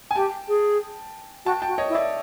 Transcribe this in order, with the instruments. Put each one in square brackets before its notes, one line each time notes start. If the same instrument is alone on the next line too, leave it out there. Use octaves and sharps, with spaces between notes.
[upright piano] G#5
[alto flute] G4 [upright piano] G5 A5
[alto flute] G#4
[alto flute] F#4 [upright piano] G5 A5
[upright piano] G5 A5
[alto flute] F#4
[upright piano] C#5 D#5
[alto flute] E4
[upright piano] D5 E5